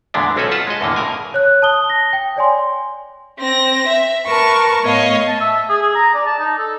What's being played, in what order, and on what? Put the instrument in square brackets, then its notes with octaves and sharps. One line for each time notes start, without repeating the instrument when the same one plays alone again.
[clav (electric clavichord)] E2 A#2 D3 G#3 B3 D4
B1 C4 C#4 A4 G#5
F4 B4 F#5 A5
G#3 D#5
E2 A2 D3 A#3
A2 C#3 A#4 G#5
[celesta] C#5 F#6
A5 D#6 G7
A#6
G5
C#5 D5 G#5 C6
[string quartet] C4 A#6
E5
A#4 B4 A5 C#6
A2 B3 C#5 D#5 F5
[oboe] A5
E5
G#4
G#4
A#5
D5
A5
D#4
A4